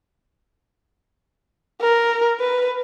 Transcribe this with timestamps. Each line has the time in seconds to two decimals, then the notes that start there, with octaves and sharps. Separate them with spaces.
1.81 A#4
2.40 B4